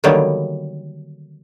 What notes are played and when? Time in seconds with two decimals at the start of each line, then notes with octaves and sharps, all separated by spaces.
0.04 D3 D#3 F#3 G3 A#3 B3